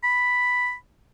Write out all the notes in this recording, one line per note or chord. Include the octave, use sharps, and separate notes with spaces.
B5